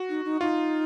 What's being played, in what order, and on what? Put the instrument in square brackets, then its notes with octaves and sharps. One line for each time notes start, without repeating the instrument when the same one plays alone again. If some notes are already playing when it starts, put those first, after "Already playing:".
Already playing: [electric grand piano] F#4
[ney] D#4
D#4
[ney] D#4 [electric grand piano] F4